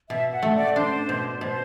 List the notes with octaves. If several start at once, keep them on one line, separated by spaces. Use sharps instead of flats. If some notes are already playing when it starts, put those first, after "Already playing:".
B2 E5
F#5
A3
D5
D4 C5
B2
B2 C5